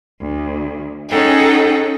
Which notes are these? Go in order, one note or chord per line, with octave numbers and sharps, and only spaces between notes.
D2
C#4 D#4 G#4 A4 F#5 G5